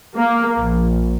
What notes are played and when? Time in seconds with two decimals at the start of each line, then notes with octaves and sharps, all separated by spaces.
0.15 A#3
0.58 A#1